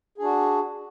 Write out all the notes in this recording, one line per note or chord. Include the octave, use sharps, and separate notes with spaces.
D4 F#4 G#4